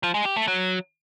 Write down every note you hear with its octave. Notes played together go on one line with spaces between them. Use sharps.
F3
G#3
G4
A3
F#3